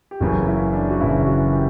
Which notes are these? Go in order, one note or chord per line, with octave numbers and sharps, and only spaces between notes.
G4
F#1 F#2 C#3 E3 F#4
E4
D4
F#4
F#1 F#2 C#3 E3 E4
F#4
G4